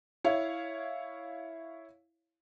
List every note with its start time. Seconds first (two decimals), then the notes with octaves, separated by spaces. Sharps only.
0.24 E4 C#5 F5